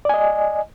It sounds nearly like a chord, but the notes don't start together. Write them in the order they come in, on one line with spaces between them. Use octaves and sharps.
D5 G#5 D#5